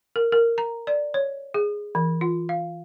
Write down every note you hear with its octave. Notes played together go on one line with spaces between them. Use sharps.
A#4
A#4
A#5
D5
C#5
G#4
E3
F4
F5